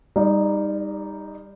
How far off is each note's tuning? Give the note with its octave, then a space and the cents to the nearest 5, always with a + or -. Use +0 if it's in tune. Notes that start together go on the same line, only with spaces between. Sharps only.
G3 +25 D#4 +0 D5 -20